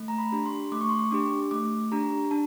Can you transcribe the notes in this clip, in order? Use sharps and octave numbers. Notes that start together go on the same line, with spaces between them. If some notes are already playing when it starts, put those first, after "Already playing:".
Already playing: A3
A#5
B5
D4 G4
C6
A3 D6
C#6
C6
C#6
D4 G4 D6
A3 D6
D4 G4 A#5
D4 A5